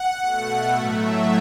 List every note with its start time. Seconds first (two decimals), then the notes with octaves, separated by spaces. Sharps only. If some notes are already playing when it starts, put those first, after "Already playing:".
Already playing: F#5
0.19 B2 A3
0.69 A2 F#3 A3 E5